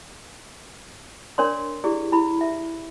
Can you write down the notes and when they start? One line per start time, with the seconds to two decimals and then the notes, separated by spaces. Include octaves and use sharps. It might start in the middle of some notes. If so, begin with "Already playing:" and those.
1.38 D4 A#4 C#5 D5 C6
1.84 E4 G4 G#4 D5
2.12 E4 B5
2.41 E5